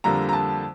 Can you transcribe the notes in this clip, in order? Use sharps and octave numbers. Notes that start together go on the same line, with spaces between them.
F2 D3 G3 A#3 A#5
A#5
A5